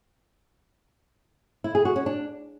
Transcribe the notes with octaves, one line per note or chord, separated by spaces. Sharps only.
E4
G#4
F#4
C#4
D4